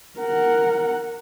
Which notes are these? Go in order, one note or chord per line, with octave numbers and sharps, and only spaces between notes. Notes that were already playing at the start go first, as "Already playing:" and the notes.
A#4 F#5